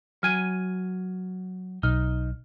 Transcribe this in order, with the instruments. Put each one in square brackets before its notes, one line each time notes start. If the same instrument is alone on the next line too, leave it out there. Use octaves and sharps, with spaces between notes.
[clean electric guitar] F#3 G#5 [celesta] F6 G#6 D#7
[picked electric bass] B1 [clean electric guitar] D#4 [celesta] F6